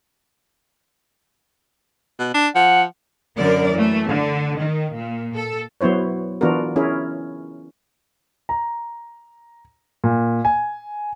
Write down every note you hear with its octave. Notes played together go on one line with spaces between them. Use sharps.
B2
D4
F3 F#5
F#2 D3 A#4 D5
E3 A3
D3
D#3
A#2
A4
F#3 B3 E4 C5 C#5
E3 B3 D4 F4 F#4 A#4
C#4 E4 G#4 A#4
A#5
A#2
G#5